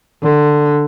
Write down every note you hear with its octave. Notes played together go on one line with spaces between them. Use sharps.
D3